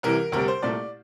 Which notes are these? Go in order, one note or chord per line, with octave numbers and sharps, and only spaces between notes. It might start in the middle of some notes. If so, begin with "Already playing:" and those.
C2 C3 E3 A#4
D2 C3 G3 A#4
C5
C2 A#2 A3 D5